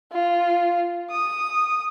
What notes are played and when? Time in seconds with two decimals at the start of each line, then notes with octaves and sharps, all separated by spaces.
0.12 F4
1.11 D#6